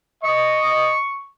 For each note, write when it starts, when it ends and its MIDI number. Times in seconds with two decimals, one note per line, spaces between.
0.24 0.94 75
0.24 1.28 85